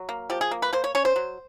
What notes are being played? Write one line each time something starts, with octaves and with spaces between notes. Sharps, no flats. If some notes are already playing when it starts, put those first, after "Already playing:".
Already playing: F#3
A#3
F3 G4
G#4
A#3
B4
A#3 C5
C#5
C#4 C#5
C5
F#3